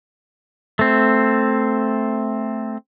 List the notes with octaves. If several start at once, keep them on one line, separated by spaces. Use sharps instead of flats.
A3 C4